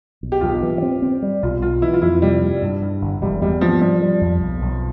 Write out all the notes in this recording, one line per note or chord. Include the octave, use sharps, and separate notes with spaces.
B1
G4
B1 F4
G4
E3
C4
C4
G3
B1 F4
B1 F4
E3 E4
F4
F2 E4
C3 G3
G3
G2
G2
G1
E1 G3
E2 G3
F3 B3
F3 G3
G3
F2
B1
B1